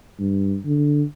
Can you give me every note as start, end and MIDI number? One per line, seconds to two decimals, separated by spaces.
0.19 0.58 43
0.65 1.03 50